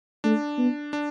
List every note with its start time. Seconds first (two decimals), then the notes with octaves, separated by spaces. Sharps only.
0.24 A3 D4
0.58 B3
0.93 D4